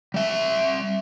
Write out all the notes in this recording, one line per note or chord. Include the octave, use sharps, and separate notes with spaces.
G3 E5